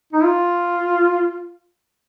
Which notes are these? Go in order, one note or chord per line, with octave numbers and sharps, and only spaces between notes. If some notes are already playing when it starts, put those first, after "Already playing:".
D#4
F4